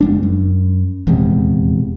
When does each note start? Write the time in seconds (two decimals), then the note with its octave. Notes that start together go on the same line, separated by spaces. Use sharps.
0.01 F#1 G#3 D4
0.23 F#2
1.07 D#1 E2 C3 G#3